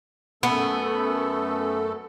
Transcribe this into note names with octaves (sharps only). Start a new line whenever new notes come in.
F#2 A3 B3 A4